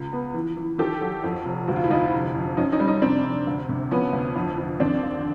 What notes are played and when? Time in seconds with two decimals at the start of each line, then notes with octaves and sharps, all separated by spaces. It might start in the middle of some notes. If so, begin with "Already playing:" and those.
Already playing: C#2
0.13 B3
0.34 E3
0.57 E3
0.78 D#3 G4 A4
1.01 F#3
1.24 F2
1.45 F1
1.68 D2 F#4
1.76 F4
1.84 E4
1.90 D2 D#4 F4
2.13 F1
2.35 F2
2.57 F#2 C#4 D#4
2.72 C#4 D#4
2.80 G3
2.87 C#4 D#4
3.02 F1 C4 D4
3.24 F1
3.47 D2
3.69 C3
3.91 F3 B3 C#4
4.13 D2
4.36 F2
4.58 F2
4.80 D#2 C4 D4
5.03 D3